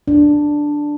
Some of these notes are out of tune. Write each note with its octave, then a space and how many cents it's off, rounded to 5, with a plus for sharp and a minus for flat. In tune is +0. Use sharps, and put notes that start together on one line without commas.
D4 +0